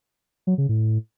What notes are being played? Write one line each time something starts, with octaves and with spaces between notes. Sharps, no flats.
F#3
C#3
A2